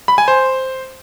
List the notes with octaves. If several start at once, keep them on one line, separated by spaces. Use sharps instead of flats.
B5
G#5
C5